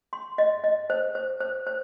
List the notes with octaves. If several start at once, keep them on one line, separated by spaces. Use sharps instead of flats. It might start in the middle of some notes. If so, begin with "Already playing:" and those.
C6
D#5
D#5
C5
C5
C5
C5